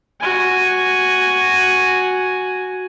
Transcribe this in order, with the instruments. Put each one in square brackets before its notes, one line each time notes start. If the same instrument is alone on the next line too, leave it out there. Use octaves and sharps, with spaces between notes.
[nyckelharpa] F#4 G#5